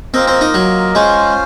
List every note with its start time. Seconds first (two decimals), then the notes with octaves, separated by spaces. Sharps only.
0.14 A#3 C4 F4 A#4 D#5
0.28 C4
0.41 D#4
0.54 F#3
0.95 G#3 C#4 F4 C5